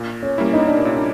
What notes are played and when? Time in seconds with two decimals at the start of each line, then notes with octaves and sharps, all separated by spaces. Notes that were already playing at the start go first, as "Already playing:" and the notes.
Already playing: A#2
0.23 C#4
0.38 G3 A#3 C#4 E4
0.53 D#4
0.67 D4
0.80 A#2 C#4
0.94 D4